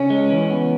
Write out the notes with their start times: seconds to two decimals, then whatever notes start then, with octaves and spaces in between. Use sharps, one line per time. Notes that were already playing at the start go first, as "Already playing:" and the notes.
Already playing: C#3 C#4
0.10 G#3
0.30 E3
0.50 B3